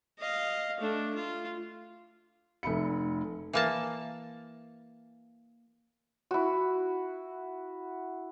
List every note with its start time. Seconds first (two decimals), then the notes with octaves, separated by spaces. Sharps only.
0.19 D#5 F5
0.80 A3 D4
1.15 F4
2.63 F1 E5 B5 C#7
3.53 E3 A#3 A5
6.31 E4 F#4